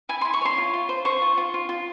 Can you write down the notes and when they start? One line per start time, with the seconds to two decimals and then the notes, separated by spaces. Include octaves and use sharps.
0.09 E4 G#5
0.21 C6
0.25 E4
0.33 C#6
0.41 C#5 C6
0.58 F4
0.74 F4
0.89 C5
1.05 C5 C#6
1.22 F4
1.37 F4
1.54 F4
1.69 F4